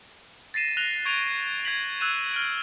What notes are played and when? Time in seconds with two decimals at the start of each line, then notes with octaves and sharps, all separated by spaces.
0.54 A6 A#6 C7 D#7 E7
0.77 F#6 A#6 F7 G7
1.05 C#6 G#6 D7 D#7 F7
1.65 G#6 B6 F#7
2.00 E6 F#6 G#6 D#7 E7
2.33 F6 D7